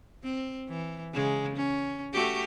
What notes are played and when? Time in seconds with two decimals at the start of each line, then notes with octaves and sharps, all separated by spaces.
0.23 C4
0.68 E3
1.13 C#3 G#3
1.57 C#4
2.13 A3 F#4 G4